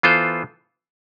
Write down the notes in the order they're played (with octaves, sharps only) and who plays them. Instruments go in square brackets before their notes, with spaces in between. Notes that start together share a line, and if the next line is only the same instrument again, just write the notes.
[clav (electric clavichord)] E3 B3 F4 A4 C5